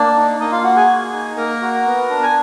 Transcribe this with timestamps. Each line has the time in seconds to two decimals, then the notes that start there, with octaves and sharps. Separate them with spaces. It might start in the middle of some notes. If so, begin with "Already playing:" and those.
Already playing: A#3 D4 D5
0.16 D#4
0.40 A#3 D#4 D#5
0.52 F4 F5
0.64 F#4 F#5
0.76 G#4 G#5
0.88 A#3
1.13 D#4
1.37 A#3 A#4 A#5
1.62 F#4
1.86 B3
2.10 D4
2.23 G#5